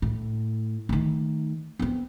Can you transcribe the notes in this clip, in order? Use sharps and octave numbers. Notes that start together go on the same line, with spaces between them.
A2
D#3 A3
B3 C4